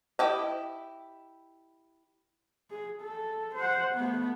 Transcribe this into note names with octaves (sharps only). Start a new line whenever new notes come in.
E4 G4 D#5
G#4
A4
C5 F#5
A3 B3